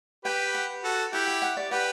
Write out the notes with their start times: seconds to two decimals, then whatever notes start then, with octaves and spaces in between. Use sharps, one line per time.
0.25 G4 B4 G5
0.55 F#5
0.84 F#4 A4
1.13 E4 G4 F#5
1.27 G5
1.42 F#5
1.57 D5
1.71 G4 B4 F#5